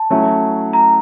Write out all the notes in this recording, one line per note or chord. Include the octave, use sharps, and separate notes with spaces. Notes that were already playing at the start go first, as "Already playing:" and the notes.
Already playing: A5
F#3 A3 C#4 E4
A#5